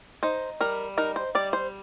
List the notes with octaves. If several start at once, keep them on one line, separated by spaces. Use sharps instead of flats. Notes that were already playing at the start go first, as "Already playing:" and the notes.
D#4 C5
G3 A#4
D#4 A#4
C5
G3 D5
C5